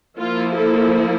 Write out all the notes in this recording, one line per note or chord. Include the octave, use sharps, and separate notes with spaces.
F3 A#3 E4 F4
A4